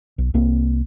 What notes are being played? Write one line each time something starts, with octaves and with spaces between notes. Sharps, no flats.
B1
C2 A#3 C4